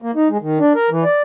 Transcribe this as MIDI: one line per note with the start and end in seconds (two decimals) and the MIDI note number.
0.02 0.11 58
0.15 0.28 63
0.29 0.38 56
0.41 0.59 51
0.59 0.73 62
0.75 0.90 70
0.90 1.04 52
1.04 1.22 74